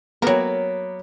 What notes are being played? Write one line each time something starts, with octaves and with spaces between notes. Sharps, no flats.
F#3 A#3 B3 A#4